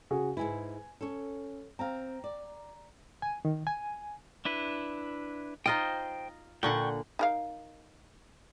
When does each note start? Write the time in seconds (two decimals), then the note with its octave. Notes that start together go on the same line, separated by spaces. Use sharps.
0.10 C#3 F#4 G#4
0.37 G#2 G#3 E4 B4 G#5
1.01 C#4 A4 C#5
1.79 C4 F5 A#5
2.24 D5
3.22 G#5
3.45 D#3
3.67 G#5
4.45 D4 E4 B4
5.66 D#4 F4 C5 D#5 G5
6.63 A#2 D3 F#5 G5 C#6
7.19 D#4 A#4 F5